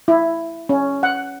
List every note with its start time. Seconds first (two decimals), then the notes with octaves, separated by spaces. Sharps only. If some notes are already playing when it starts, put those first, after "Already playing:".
0.08 E4
0.69 C#4
1.03 F#5